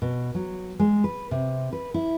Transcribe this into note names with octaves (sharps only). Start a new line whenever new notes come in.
B2
F#3
G#3
B4
C3
B4
E4